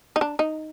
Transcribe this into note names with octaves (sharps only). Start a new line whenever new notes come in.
D#4
D4
D#4